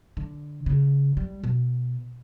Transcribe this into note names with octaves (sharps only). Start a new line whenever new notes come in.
D3
C#3
G3
B2